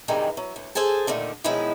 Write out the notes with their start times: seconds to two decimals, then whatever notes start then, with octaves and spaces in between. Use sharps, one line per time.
0.08 G2 C3 D#3 E3 G3 G#3
0.37 F#3
0.56 D2
0.75 G#4 A4 C5 G#5 A5
1.07 A#2 D3 D#3 A3
1.44 B2 D#3 F3 F#3 G#3 E4